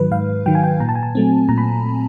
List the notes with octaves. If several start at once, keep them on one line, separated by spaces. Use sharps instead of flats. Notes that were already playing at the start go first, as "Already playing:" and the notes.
Already playing: G#2 D#3 F#3 B4
G#2 F5
D#3 F#3 G5
G#5
G5
A#2 A#5
A5
G#5
A5
F#3 A3 C4
A#2 A#5
B5